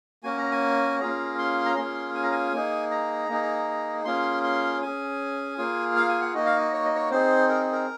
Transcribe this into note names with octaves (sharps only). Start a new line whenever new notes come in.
A#3 C#4 F#4 G#5
A#5
G#5
A#3 C#4 F4 G#4 A#5
C6
A#5
A#3 C#4 F4 G#4 C6
G#5
A#5
G#5
A#3 D#4 G#4
A#5
A#3 D#4 G#4
A#3 C#4 F4 G#4 C6
C6
C#4 G#4 G#5
A#3 F4 G#4
F5
G#5
F#5
A#3 D#4 F#4 D#5
F5
D#5
C#5
D#5
C#5
C4 D#4 G#4 C5
A#4
A#4